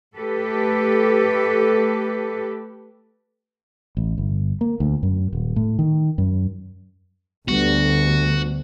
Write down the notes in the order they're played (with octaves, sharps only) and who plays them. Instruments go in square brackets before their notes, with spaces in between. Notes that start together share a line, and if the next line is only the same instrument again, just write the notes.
[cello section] A3 G4 A4 B4
[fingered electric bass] A1
G1
A#3
D2
F#2
D#1
A2
D#3
F#2
[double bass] D2 [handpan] D3 G3 B3 [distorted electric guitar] F#4